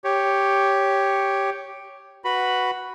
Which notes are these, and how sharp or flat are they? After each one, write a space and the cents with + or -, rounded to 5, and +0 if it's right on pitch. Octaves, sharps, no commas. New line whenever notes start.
G4 +0 C#5 +0
F#4 +0 B4 +0 B5 +0